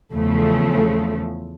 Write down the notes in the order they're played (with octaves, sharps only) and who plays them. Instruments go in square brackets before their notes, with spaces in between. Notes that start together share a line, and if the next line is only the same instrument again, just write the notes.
[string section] E2 C#3 F3 A3